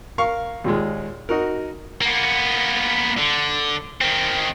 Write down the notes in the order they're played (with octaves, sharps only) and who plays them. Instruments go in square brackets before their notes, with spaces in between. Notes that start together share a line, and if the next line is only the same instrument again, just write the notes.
[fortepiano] A#4 F5 C#6
D#2 A#2 G#3
D#4 F#4 A#4
[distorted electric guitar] A#3 B3
D3
D#3 C4